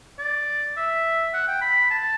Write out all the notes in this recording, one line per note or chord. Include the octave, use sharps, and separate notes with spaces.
D5
E5
F#5
G5
B5
A5